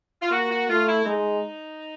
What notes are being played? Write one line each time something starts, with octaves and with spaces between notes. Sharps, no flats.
F4
A#3 F#4
F#4
A3 F4
E4
G#3 D#4